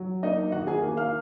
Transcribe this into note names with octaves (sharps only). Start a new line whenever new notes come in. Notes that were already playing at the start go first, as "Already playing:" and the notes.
Already playing: F#3
A#3 D#4 D#5
D#3 F#4 F#5
G#4 G#5
A#3
F5 F6